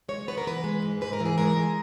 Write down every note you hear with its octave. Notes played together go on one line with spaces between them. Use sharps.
G#3 C#5
B3 B4
A#4
E3 B4
G#3
G#2
G#2 B4
A#4
E3
G#4
G#3 A#4
G#3